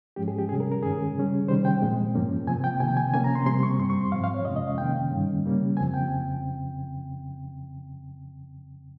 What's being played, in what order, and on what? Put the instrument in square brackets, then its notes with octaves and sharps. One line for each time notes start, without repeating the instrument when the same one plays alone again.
[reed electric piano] G#2 F3 G#3 C#4 G4
G#4
G4
C3 G3 C#4 G#4
A#4
A#4
G2 D#3 G#3 C#4 G#4
C#3 G3 C#4
C3 D#3 G3 C#4 C5
G5
A#2 F3 G#3 C4
G2 F3 A#3 C#4
C3 F3 C4 G#5
G5
C3 D#3 A#3 G#5
G5
G#5
C3 F3 A#3 C#4 G#5
A#5
C6
C3 G3 C4 C6
C#6
G2 G3 C4 C6
C#6
C6
G#2 F3 C4 F5
F5
C#5
F2 C3 F3 G#3 C#4 D#5
D#5
F5
C3 D#3 A#3 C#4 G5
G2 D#3 G3 C#4
C#3 G3 A#3 C#4
F2 C#3 F3 C4 G#5
G5